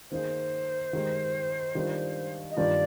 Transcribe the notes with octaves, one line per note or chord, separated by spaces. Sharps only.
D#3 A#3 D#4 G#4 C5
D#3 G#3 D#4 G4
D#3 G3 D4 F4
D#5
G2 D#3 A#3 D4 F4 D5